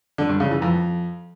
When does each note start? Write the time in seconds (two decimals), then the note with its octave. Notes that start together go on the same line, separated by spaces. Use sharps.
0.18 D3
0.29 G2
0.40 C#3
0.51 E3
0.62 F2